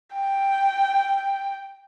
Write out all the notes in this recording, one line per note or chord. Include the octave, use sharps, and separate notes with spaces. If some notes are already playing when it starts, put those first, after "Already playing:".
G5